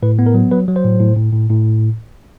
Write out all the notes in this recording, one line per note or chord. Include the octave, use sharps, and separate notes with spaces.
A2 B4
B3
A#4
F#3
F#3 B4
F#3
C5
A2
A2
A2
A2
A2